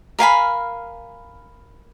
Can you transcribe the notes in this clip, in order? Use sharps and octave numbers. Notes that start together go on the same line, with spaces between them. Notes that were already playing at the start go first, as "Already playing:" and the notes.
A#4 F5 G#5 B5